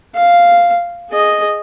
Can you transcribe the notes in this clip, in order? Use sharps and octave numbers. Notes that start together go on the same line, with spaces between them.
F5
G#4 D#5